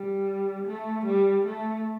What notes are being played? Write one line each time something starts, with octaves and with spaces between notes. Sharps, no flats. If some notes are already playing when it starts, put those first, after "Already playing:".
Already playing: G3
A3
G3
A3